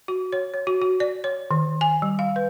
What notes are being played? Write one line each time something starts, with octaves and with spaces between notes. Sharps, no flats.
F#4
C#5
C#5
F#4
F#4
D5
C#5
D#3
G#5
G3
F5
B4